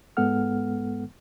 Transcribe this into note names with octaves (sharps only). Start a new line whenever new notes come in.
G#2 G#3 B3 A4 F#5 F6